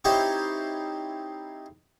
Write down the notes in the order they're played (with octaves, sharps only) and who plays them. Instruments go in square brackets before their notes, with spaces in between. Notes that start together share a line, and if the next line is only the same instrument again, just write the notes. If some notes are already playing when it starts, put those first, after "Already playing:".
[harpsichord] C4 D#4 E4 G4 C5 C#5